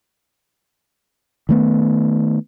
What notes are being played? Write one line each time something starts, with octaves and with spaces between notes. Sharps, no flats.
D#3 A3 B3